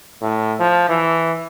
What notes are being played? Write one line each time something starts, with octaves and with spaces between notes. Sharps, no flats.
A2
F3
E3